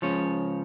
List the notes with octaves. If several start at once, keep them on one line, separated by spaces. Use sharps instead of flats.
C#2 C#3 F3 C#5